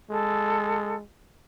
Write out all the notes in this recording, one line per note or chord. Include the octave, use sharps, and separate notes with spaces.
G#3 A4